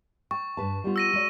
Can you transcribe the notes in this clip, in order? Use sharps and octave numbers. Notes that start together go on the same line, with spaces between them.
G5 C#6
G2 B4 A5
G3 B3 F4
E6 A#6 D#7
G#3 F#4 D5 D#7